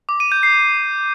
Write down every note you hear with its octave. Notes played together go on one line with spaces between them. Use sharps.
D6
D#7
G6
C7